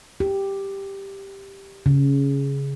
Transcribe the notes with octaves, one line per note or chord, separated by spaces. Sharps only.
G4
C#3